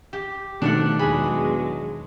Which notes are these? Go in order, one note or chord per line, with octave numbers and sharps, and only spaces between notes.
G4
B2 D#3 F3 A3 D4 D5 F#5
E2 F#3 G#3 G#4 B5